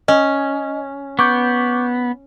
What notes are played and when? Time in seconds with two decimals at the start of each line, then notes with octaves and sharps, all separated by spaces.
0.08 C#4 D#5
1.19 B3 C#6 D6 G6